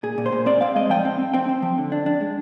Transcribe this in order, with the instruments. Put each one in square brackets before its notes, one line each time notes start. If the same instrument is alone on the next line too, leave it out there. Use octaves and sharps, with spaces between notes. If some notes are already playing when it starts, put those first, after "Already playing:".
[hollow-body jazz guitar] A#2 G#4
A#2
C5
A#2
C4 D5
C4 F5
G#3 D#5
F3 G5
C4
C4
C4 G5
C4
F3
D3
D4
D4
G#3